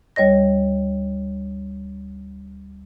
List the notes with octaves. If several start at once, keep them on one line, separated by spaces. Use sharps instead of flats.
D2 G3 C#5 D#5 A#6